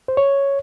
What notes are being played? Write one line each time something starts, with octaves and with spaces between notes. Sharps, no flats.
C5
C#5